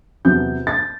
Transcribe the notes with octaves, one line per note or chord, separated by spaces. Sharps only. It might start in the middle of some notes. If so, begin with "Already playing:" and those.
E2 C3 F#3 B3 G6
A6